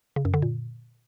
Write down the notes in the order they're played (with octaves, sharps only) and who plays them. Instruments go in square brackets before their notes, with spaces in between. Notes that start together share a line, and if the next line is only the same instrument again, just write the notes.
[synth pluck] C#3
F#2
D3
A#2